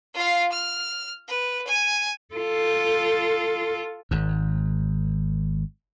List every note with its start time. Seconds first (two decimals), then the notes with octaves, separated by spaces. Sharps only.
0.14 F4 F5
0.52 F6
1.28 B4
1.67 G#5
2.34 F4 A4
4.11 G#1 G#2